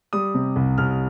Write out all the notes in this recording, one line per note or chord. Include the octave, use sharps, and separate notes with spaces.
G3 D#6
C3
C2
C2 F6